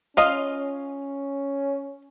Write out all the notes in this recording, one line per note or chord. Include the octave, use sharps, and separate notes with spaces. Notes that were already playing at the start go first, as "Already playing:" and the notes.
C#4 F4 D#5 F5